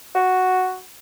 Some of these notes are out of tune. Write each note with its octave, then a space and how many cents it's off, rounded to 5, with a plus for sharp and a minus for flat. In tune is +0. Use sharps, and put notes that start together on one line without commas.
F#4 +0